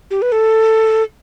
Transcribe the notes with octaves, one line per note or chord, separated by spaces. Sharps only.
G4
B4
A4